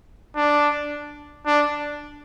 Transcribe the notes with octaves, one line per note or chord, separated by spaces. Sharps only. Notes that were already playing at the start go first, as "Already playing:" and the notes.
D4
D4